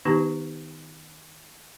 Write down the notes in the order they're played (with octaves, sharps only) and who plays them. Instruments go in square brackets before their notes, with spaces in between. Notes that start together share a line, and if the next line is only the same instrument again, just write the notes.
[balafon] D#3 B3 D4 D#4 G4 B4